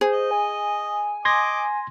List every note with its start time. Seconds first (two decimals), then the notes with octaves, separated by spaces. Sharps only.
0.01 G#4 C5
0.13 D#5
0.31 G#5
1.25 D#5 C6 D6 G#6 A#6